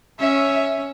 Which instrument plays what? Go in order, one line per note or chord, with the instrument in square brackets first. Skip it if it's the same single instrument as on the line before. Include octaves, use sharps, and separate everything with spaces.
[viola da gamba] C#4 [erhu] E5